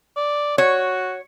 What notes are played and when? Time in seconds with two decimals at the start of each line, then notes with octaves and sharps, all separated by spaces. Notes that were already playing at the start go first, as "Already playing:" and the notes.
0.16 D5
0.58 F#4 C#5